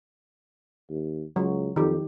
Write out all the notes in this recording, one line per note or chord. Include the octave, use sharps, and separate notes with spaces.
D#2
C#2 F#3
F2 D#3 G4